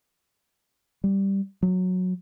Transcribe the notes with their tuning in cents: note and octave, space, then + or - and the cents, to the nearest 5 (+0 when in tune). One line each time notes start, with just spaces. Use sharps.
G3 +0
F#3 -15